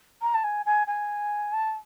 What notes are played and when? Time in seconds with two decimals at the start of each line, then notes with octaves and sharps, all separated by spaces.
0.22 A#5
0.34 A5
0.44 G#5
0.66 G#5
0.87 G#5
1.53 A5